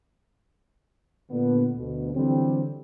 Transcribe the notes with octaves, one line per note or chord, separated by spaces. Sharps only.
A#2 D3 B3
D2 B2
D3 E3 F#3 G3 C4